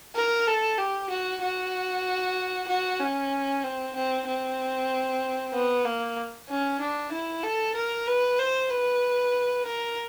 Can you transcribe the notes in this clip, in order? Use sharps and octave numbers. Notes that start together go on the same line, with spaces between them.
A#4
A4
G4
F#4
F#4
F#4
C#4
C4
C4
C4
B3
A#3
C#4
D4
E4
A4
A#4
B4
C5
B4
A#4